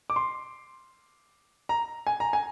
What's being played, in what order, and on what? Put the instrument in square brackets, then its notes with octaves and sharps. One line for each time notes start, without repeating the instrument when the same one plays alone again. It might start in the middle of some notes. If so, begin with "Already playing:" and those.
[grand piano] D6
C6
A#5
G#5
A#5
G#5